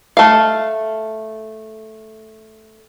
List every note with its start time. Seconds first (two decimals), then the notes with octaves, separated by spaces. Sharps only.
0.17 A3 F5